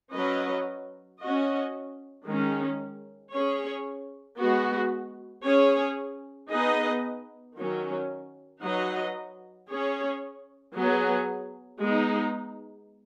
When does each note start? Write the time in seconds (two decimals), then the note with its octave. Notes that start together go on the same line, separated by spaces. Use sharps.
0.13 F#3 C#4 B4 D#5
1.20 C#4 F#4 D#5
2.25 D#3 G#3 C#4
3.32 C#4 G#4 C#5
4.38 G#3 B3 F#4
5.44 C#4 G#4 C#5
6.50 B3 D#4 G#4 B4 D#5
7.57 D#3 F#3 C#4
8.63 F#3 D#4 F#4 B4 D#5
9.69 C#4 G#4 C#5
10.74 F#3 B3 G#4
11.80 G#3 B3 D#4